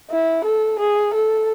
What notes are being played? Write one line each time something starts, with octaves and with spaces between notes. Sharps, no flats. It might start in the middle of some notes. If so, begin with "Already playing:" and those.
E4
A4
G#4
A4